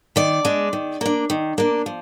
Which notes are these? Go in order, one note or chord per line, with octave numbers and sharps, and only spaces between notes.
D#3 D5
G#3 D4
D#3
A#3 D4
D#3
A#3 D4
F3